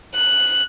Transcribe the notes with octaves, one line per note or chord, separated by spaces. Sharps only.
F#6